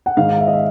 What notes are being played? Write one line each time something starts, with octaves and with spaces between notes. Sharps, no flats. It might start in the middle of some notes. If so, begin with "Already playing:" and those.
F#5
G#2 D#3 F5
E5
D#5
E5